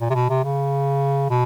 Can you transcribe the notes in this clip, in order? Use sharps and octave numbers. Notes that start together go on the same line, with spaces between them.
A#2
C3
B2
C3
C#3
B2